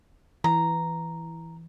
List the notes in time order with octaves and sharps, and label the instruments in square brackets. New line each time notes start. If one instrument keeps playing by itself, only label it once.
[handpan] E3 [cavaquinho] A#5